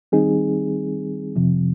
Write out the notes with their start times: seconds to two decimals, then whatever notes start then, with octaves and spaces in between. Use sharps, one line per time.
0.12 D#3 G3 C4 D#4 G#4
1.36 F2 C3 F3